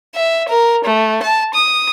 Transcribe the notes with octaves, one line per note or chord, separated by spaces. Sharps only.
E5
A#4
A3
A5
D#6